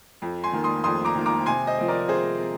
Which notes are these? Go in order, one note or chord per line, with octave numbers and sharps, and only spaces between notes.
F2
G#5 C6
D#3 A#3
C6 D#6
F2 C6 D#6
A#5 D6
D#3 A#3
A#5 D6
C3 G#5 C6
C5 D#5
F3 C4
A#4 D5
C3 G#4 C5
C4